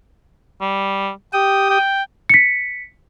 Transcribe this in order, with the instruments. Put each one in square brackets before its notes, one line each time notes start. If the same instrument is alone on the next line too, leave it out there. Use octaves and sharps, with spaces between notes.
[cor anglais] G3
[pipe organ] G4 D#6 [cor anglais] G5
[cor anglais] G5
[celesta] B6 C#7